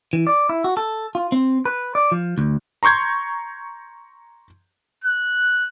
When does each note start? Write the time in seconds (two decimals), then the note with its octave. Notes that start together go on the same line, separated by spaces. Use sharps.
0.13 E3
0.27 D5
0.49 E4
0.64 F#4
0.77 A4
1.15 F4
1.32 C4
1.65 B4
1.95 D5
2.12 F3
2.38 D2
2.83 A#5 C6 C#6 G6 G#6
5.04 F#6